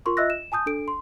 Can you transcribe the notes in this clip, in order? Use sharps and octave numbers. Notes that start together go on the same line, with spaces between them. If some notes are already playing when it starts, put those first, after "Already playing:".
F4 A#4 C6 C#6
F4 D#5 E5 E6 F#6 A#6
E7
G#5 A5 D#6 G6
D4 A4 D7
C6